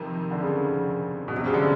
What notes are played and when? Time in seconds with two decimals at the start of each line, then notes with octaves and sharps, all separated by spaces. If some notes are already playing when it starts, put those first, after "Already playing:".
Already playing: F2 C3 D#3
0.31 D3
0.41 C#3
1.28 B2
1.36 C3
1.45 C#3
1.54 D3